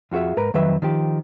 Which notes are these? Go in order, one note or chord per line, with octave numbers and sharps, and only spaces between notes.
F2 F4 F#4 G#4 E5
G#2 A#4 B4 A#5
F2 D#3 F#3 B4 E5
D#3 F3 G4